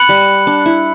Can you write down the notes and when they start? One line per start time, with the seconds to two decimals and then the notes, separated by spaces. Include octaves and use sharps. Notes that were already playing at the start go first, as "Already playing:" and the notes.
Already playing: B5 F#6 C#7 F#7
0.09 G3
0.47 D4
0.66 E4